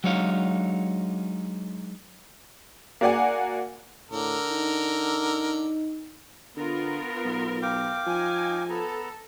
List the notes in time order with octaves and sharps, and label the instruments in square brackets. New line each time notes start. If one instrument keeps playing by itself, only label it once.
[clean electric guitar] F#3 G#3 D4 D#4 C#5 F5
[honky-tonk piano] A#3 F#4 D5 F#5 G#5
[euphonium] A2 [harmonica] D3 A#4
[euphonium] D#4
[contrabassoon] D3 [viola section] B3 F4 A#4
[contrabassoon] B1
[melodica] F5 G5 D6
[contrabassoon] F3 [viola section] D#4 G#5
[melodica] B3 A#5 [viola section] A4